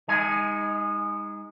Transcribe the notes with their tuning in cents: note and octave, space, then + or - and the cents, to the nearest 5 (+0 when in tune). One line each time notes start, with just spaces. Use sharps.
G#3 -30 D#4 +15 G#5 +0